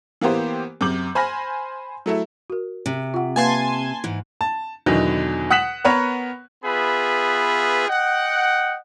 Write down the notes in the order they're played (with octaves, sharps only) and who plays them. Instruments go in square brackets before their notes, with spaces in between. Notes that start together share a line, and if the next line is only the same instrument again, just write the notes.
[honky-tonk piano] E3 A#3 B3 G4 C5
F#2 C3 D6 G6 F#7
C5 G#5 B5 C6 F6 A#6
F#3 A3 E4
[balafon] F#4 A#4
[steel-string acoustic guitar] C3
[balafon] F4 F#5
[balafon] A#3 B4 F5 [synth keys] G#5 A5 C6
[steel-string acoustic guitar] G#2 E3
[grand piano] A5
E2 B2 D3 D#3 F#3
F#5 D#6 F#6 B6 E7 F#7
B3 A#4 B4 C#5 F#5
[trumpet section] B3 F4 G#4 B4 E5 B5
D#5 F#5 G5